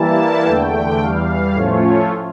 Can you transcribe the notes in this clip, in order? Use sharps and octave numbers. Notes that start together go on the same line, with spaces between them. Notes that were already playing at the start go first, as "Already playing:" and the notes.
Already playing: E3 G3 A#3 E4 A5
E2 D3 A3 G5
E2 E3 G3 F5
A2 F3 A3 C#4 F4 C#5